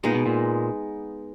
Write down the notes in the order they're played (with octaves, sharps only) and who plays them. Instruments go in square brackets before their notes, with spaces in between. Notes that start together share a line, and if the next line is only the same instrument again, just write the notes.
[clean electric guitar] A#2 [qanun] G#3 B3 D#4
[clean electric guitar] B2
A#2